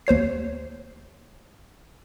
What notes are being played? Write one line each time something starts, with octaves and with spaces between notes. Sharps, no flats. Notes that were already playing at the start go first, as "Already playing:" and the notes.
D#2 C5 C#5 C7